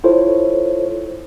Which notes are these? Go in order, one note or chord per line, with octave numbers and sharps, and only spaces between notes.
E4 F4 A4 C5 C#5